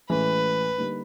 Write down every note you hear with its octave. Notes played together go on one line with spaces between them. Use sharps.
A2 E3 G#3 C#4 B4
D3 G3 A#3 D#4